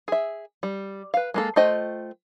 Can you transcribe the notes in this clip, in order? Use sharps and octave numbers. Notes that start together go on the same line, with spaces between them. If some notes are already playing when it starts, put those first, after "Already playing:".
G#4 E5
G3
B4 F5
G#3 A#3 A4
A3 F4 C5 D#5 G5